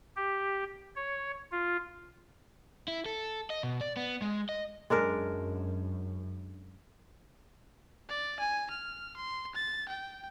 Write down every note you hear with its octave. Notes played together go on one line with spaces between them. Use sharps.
G4
C#5
F4
E4
A4
D#5
B2
D5
B3
G#3
D#5
F#2 G#3 D4 A#4
D5
G#5
F6
C6
A6
G5